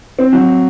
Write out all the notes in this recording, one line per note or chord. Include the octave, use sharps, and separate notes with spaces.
C4
F#3